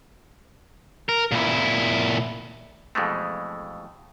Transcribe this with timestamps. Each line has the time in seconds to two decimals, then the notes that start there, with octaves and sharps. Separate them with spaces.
1.09 A#4
1.31 A#2 E4
2.95 F2 B2 E3 G#3 A3